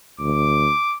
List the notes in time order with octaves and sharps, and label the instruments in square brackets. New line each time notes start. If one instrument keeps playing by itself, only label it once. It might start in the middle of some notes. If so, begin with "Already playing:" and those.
[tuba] D2 [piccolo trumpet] D6